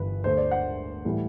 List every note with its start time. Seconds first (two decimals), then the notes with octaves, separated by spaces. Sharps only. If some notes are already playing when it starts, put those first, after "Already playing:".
Already playing: G1 G2 E3 B4
0.24 D2 D3 A3 C5
0.37 D5
0.51 F#5
1.05 A2 E3 G3